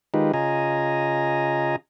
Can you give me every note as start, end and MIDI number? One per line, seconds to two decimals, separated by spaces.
0.14 0.32 51
0.14 0.32 56
0.14 0.32 63
0.14 0.32 65
0.14 0.32 67
0.14 0.32 71
0.34 1.76 49
0.34 1.76 65
0.34 1.76 75
0.34 1.76 80
0.34 1.76 82